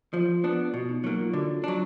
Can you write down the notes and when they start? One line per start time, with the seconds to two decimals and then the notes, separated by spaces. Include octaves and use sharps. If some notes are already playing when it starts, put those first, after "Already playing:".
0.14 F3 F4
0.44 B3 D4
0.74 B2 F#4
0.89 D#4
1.04 F#3 A#3 D#4
1.19 F4
1.33 D3 F#4
1.64 F#3 D4